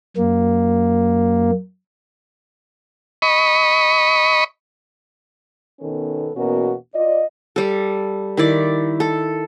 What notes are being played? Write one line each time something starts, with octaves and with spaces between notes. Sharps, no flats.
F#2 A#3
D#5 B5 C#6
B2 D#3 B3 C#4 A4
E2 B2 A#3 C#4 F#4 A#4
F4 D5 D#5
G3 A4
D#3 E4 D5
A4